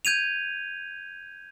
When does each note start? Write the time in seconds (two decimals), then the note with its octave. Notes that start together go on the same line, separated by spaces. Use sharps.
0.05 G6 G#6 D#7 F7